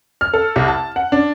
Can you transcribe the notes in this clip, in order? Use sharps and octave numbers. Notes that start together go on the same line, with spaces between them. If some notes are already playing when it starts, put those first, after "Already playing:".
F6
A4
C2
A5
F#5
D4